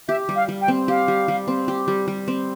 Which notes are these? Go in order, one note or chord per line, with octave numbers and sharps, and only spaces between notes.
G4 E5
G3
F5
G3
G5
C4
G4 F5
G3
G3
C4
G4
G3
G3
C4